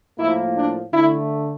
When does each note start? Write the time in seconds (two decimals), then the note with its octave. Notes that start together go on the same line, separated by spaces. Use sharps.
0.18 A2 F3 A#3 E4
0.55 D4
0.93 D3 A3 E4